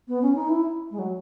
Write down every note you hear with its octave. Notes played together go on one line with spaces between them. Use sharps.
B3
C#4
D#4
E4
G#3
F#3